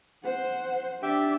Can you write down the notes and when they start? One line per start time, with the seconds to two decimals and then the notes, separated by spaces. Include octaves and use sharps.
0.23 C5 F#5
1.02 D4 G4 D5 E5 G5